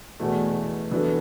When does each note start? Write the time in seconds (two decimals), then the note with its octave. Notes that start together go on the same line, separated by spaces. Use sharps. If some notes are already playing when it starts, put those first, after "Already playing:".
0.20 E2 B2 A3
0.91 E3 B3 D4 F#4 A4